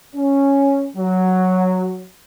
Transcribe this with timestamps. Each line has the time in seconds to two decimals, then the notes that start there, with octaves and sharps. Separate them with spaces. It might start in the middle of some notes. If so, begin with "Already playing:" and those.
0.15 C#4
0.96 F#3